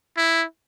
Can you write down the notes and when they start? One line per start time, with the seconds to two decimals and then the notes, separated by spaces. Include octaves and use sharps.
0.17 E4